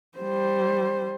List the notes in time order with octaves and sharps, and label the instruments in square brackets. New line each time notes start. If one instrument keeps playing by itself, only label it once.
[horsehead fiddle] G3 C5